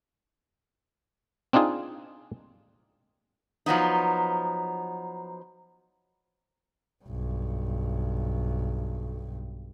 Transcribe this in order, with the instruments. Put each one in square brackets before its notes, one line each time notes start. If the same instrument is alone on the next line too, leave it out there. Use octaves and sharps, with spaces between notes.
[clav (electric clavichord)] C4 D4 D#4 F4 G#4
[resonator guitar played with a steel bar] F3 F#3 B3 D#4
[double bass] B1 G2